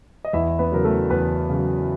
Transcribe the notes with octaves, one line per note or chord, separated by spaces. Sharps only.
D#5
E2 E4 E5
B3 B4
C#3 F#3 A#4
A3 A4
E2 B3 B4
C#3 F#3